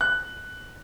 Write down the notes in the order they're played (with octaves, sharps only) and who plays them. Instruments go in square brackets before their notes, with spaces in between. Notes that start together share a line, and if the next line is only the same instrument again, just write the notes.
[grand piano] F#6